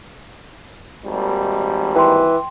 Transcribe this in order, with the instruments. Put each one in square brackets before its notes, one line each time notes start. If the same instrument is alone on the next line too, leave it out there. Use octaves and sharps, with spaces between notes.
[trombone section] G#1 D#2 G3
[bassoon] E3 [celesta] G5 C6